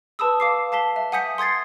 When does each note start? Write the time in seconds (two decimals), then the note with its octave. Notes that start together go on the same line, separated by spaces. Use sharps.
0.19 B4 A5 B5 D#6 E6
0.40 F5 D6 C7
0.72 F5 A5 B6 G7
0.96 E5
1.12 F#5 G#5 D#6 G6 B6 C#7
1.38 C6 D#6 G#6 A6 C7